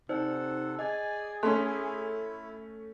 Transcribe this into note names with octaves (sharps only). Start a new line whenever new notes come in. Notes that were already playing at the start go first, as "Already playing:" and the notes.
C3 D#4 A4 C5 D5 F#5
G#4 D5 D#5 G#5
A3 C#4 E4 A5 C6 F#6